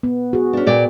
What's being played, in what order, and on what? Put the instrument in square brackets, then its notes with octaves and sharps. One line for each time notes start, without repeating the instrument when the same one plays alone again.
[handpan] B3
F#4 G#4
[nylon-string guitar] C#4 D4
A#2 D5 G5